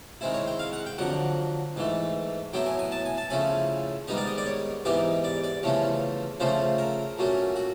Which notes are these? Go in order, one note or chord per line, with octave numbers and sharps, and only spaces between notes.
D#3 G#3 C4 E4
C#5
G5
F5
F#5
G5
F2 D3 F#3 F#5
G#2 E3 A3
A2 F#3 B3 E4 G5
G#5
G#5
A5
G#5
A5
C#3 F3 A3 C#4 E4 G#5
G#2 D#3 G3 B3 D#4 D#5
D5
D#5
D5
C#5
G#2 E3 G3 B3 D#4 D5
D5
D5
E2 C#3 F3 A3 C#4 C#5
C#3 F3 A3 C#4 C5
A#4
A#2 F#3 A3 C#4
F#4